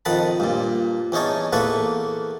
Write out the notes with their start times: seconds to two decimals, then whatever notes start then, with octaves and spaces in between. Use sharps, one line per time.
0.05 F2 D#3 F#5 A5 B5
0.40 G2 A#2
1.12 E2 C#4 D#4 C#5 A5
1.53 E2 A#3 A4 B4 F#5 C#6